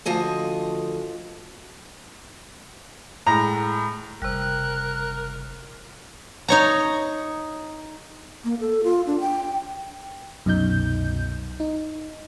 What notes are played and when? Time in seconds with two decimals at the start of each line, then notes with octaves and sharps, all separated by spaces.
0.05 D2 F3 D#5 G#5
3.27 A2 G#3 A#5
4.22 F#1 C3 G3 A#4 F#6
6.48 D#4 C#5 A#5
8.44 A#3
8.60 A4
8.84 F4
9.07 D4
9.20 G5
10.45 C2 F#2 B2 D#4 G6
11.60 D#4